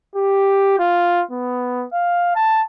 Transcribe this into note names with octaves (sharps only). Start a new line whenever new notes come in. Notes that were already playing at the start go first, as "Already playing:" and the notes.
G4
F4
B3
F5
A5